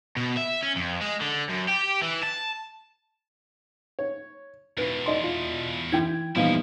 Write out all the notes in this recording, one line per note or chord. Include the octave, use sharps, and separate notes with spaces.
B2
E5
C#4
F2
G#3
D3
F#2
G4
E3
A5
C#5
E2 B2 B4
D5 D#5 C6
F4
E3 E4 G5 G#6
E2 A#2 E3 F3 G3 D#4 E4 G#4